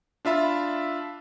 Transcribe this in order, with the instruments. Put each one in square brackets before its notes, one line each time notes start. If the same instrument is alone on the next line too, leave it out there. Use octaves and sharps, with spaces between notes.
[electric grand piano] D4 F4 E5 B5